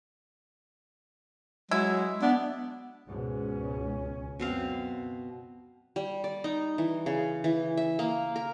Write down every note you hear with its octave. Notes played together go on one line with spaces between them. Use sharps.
F#3 G#3 E4
B3 D4
C#2 G#2 B2 C#4
F#2 B2 C4 F5
G3
D5
D#4
E3
C#3
E3
E5
A#3
A#4